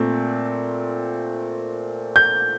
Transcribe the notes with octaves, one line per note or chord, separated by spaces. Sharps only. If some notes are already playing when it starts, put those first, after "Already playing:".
Already playing: A#2 A3 C4
G6